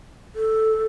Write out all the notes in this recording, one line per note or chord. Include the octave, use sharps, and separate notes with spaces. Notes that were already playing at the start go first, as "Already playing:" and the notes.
A4